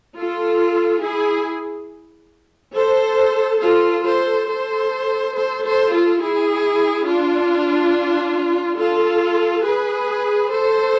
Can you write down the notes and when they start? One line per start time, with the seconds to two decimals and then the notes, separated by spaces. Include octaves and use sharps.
0.16 F4 A4
1.02 E4 G#4
2.74 A4 C5
3.60 F4 A4
4.04 A4 C5
4.47 A4 C5
5.33 A4 C5
5.62 A4 C5
5.90 F4 A4
6.19 E4 G#4
7.06 D4 F4
8.78 F4 A4
9.64 G#4 B4
10.51 A4 C5